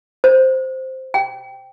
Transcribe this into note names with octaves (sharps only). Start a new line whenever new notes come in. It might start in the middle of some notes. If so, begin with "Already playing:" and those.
C5
G5